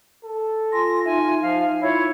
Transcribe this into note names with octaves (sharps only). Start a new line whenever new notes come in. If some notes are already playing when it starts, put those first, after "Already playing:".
A4
F4 G#5 C6 A#6
D#4 E5 G#5
F3 F5
E4 F4 C#5